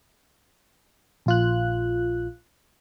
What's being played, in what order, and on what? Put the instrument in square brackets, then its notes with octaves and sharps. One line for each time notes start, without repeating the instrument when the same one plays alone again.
[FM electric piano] A#1 F4 F#6